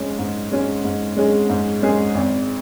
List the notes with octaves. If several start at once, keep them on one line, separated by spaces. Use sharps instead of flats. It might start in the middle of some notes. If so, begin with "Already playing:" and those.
Already playing: G#2 G#3 C#4 G#4
G#2
G#3 C#4 G#4
G#2
G#3 C#4 G#4
G#2
G#3 C#4 G#4
G#1